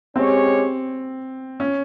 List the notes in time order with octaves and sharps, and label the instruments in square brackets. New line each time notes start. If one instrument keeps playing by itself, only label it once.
[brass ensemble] G#3 C#4 G4 C#5 [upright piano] C4
[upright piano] C#4